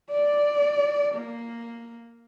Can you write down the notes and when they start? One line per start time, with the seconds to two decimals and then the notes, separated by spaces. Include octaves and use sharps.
0.10 D5
1.15 A#3